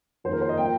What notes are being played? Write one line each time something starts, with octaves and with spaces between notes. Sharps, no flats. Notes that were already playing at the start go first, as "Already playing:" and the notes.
F2 D#3 A#3 C5
A#4
C5
D#5
F3 A#3 G5